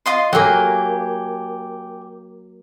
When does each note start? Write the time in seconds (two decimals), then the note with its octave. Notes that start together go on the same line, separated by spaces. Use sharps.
0.06 F4 D#5 C6
0.33 F#3 A#3 G4 G#5